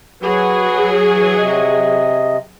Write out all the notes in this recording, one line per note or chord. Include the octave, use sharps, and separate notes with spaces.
F#3 F#4 G#4 B4
E3
C3 D#5